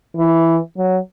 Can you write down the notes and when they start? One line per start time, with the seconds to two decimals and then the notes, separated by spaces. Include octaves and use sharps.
0.17 E3
0.77 F#3